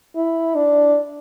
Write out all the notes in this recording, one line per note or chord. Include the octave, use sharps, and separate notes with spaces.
E4
D4